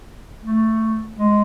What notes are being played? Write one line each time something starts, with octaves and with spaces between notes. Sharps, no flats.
A3
G#3